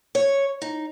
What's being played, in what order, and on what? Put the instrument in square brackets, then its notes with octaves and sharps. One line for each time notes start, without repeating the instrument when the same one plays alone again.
[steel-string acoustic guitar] C#5
D#4